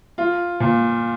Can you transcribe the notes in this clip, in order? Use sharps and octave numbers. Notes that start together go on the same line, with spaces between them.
F4
A#2